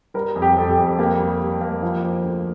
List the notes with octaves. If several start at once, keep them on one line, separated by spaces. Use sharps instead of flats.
G3 A#4
F2
G4
F2 A4
G4
F2
A#3 G4
G3
G3
A#3
F3
F3
D2